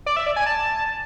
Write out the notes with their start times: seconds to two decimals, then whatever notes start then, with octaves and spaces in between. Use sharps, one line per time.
0.06 D5
0.16 E5
0.26 D5
0.36 G#5
0.46 A5